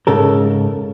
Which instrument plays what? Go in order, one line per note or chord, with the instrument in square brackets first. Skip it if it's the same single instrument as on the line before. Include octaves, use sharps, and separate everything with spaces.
[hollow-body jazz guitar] G#2 C#3 A4 A#4